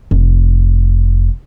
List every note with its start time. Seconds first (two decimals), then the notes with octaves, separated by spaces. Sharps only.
0.11 F1